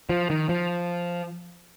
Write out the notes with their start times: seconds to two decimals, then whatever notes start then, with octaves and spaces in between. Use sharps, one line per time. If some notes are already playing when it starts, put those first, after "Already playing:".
0.09 F3
0.30 D#3
0.49 F3